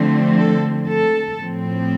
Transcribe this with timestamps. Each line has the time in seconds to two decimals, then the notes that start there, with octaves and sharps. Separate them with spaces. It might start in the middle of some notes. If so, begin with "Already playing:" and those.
Already playing: D3 F3 A3 C4
0.38 A4
0.89 A4
1.39 A2 F3 C4